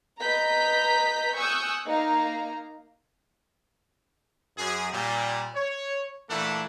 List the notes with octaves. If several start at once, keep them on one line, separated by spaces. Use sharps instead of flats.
B4 D#5 A#5 G6 B6
G#5 C#6 D#6 E6 F#6 G6
A#3 D#4 F5 A#5
F#2 G#4
A#2 G3
C#5
A#2 E3 A3 D4 A4 F#5